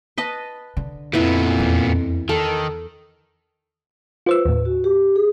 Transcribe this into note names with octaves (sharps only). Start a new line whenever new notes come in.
B4 D#5 A5
D3
F2 A#2 B3 E4 B4
E2
D#3 A4
F4 B4 C5 E6
D#2 A2
F#4
G4
G#4